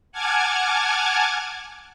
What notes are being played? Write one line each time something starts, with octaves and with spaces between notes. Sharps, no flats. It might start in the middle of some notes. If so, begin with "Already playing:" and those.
F#5 G#5 A5 D6 F6 G#6